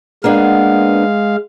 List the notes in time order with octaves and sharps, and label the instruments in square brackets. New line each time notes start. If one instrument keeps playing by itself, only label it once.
[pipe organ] G#3 F5 [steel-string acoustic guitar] A#3 B3 D4